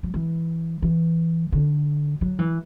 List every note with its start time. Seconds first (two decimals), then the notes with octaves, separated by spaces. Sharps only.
0.03 F#3
0.14 E3
0.82 E3
1.52 D3
2.21 F#3
2.39 E3